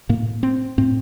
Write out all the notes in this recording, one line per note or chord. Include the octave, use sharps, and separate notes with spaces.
A2 A#3
C4
A2 C4